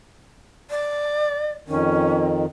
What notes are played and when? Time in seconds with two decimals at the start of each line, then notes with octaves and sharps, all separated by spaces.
0.70 D5
1.68 F2 D#3 C#4